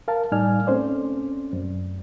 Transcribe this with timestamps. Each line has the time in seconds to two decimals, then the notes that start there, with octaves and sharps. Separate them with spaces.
0.08 A#4 F5 A5
0.32 A2 G3 D#4 D5 G#5 F6
0.67 A3 C4 C#4 C5 D5
1.53 F#2